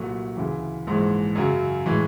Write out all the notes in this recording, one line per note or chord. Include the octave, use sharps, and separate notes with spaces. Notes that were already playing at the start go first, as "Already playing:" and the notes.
Already playing: C2 A#2 F#3 A3
D2 C#3 E3
A#1 G#2 E3 G#3
F#2 C#3 F#3
A2 E3 G#3